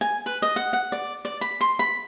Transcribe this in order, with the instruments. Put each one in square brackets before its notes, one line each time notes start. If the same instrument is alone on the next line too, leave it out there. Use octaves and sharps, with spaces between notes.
[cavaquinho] G#5
B4
D#5
F#5
F#5
D5
D5
B5
C6
B5